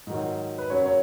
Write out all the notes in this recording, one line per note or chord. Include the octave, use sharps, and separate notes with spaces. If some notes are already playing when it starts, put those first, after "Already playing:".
G#2 D#3 F#3
B4
F#2 C#3 F#3 C#5
C#5